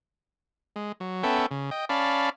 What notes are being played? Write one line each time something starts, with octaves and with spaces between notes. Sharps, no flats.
G#3
F#3
B3 C#4 A4 E5 G5
C#3
D#5 G5
C#4 D5 F5 A5 B5